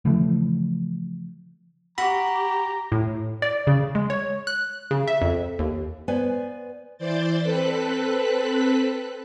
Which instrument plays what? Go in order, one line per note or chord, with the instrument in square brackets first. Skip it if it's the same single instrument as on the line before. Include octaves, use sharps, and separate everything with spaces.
[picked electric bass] C#3 E3 F3 A3
[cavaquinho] F#4 [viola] G4 [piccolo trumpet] A#5 [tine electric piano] B5
[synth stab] A2
D5
C#3
G#3
C#5
F#6
C#3
E5
F2
D#2
[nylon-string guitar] B3 B4 C5 D5 G#5
[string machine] E3 C5 D5 G6 A6
C4 A4 B4 F#6 B6